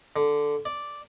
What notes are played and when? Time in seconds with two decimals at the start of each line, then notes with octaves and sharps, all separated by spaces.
0.16 D3
0.65 D5